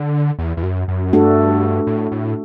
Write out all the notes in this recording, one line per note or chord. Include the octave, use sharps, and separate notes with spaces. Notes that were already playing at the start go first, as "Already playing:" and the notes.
Already playing: D3
E2
E2
F#2
F#2
G2 A3 D4 F#4 A4
A2
A2